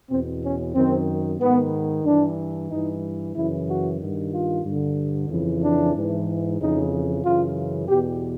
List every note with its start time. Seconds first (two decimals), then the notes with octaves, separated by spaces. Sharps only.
0.10 E2 B2 C4
0.43 C#4
0.75 F#2 D#3 C4
1.40 G#2 D#3 B3
2.05 G2 E3 D4
2.70 G2 E3 D#4
3.35 F#2 C#3 E3 E4
3.68 F#4
4.00 G2 D#3
4.32 F4
4.65 G2 D3
5.30 F2 C#3 E3
5.62 D4
5.94 G#2 E3
6.59 F2 C#3 E3 D#4
7.24 F#2 C#3 E3 F4
7.88 E2 B2 G4